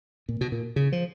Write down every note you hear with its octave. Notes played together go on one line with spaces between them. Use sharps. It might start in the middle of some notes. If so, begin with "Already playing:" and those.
A#2
B2
A#2
C#3
F3